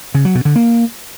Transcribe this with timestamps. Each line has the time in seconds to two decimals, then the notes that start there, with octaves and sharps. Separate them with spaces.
0.15 C#3
0.25 F#3
0.35 B2
0.45 D3
0.56 A#3